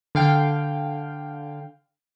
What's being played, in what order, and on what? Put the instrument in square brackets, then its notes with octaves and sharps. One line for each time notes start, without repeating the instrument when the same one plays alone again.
[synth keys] D3 F5 G5